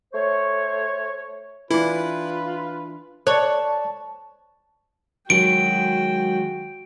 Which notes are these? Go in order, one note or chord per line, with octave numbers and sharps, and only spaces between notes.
A3 C5 C#5
E3 D4 E4 F4 B4
C#5 D5 A5 C#6 F#6
D#3 F#3 G#3 F#4 G5 D7